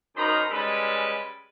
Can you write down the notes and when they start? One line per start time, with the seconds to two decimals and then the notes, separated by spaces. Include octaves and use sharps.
0.16 F#2 D#4 A#4 C5 A#5 B5
0.51 G3 G#3 C#4 A4 B4